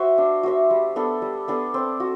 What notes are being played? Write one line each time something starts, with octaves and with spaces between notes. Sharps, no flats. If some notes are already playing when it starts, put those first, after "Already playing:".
Already playing: F#4 C5 E5
D4
F#4 C5 E5
G3
B3 D4 A4
G3
B3 D4 A4
C4
F#4